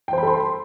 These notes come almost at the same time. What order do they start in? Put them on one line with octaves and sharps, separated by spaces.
G5 C5 B5 A4 C6